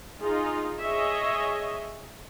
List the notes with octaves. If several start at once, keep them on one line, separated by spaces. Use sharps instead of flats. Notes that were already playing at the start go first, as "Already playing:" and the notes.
D#4 F4 G#4
G#4 C#5 D#5 E5